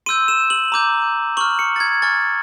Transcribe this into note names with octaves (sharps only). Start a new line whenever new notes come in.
C6 E6 G6 D#7
E7
F#7
A#5 D6 G6
C#6 F6 F#7
C#7
A6
G#6
G#5 C#6 F6 A6